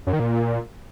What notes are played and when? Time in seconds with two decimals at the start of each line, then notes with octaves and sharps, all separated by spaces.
0.07 F#2
0.13 D#3
0.20 A#2